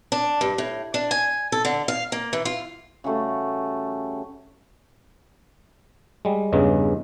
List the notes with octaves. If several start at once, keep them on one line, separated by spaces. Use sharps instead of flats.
D4
G2
A2
D4
G#5
A4
D3
F5
A#3
E3
F4
C#3 G3 A3 F#4
G3 G#3
E2 G2 C#3 G#3